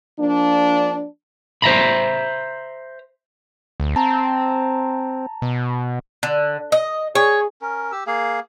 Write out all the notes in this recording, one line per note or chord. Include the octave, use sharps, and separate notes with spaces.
F3 A#3 D4
C5 E5 A#5 B5
D2
C4 A5 A#5
B2
D3
D#5
G#4 C#5
C#4 A#4
G4 E6
A#3 G#4 F5